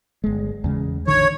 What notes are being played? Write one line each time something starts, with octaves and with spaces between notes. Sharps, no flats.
G1 G#3
E2 C#3 G#3
A1 D3 D#3 C#5